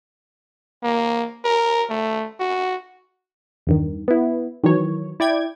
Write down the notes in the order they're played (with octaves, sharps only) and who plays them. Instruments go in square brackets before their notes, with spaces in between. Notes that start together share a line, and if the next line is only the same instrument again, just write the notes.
[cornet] A#3
A#4
A3
F#4
[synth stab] E2 G2 D#3
B3 E4
D#3 E3 F#3 C#5
E4 D5 G5 G#6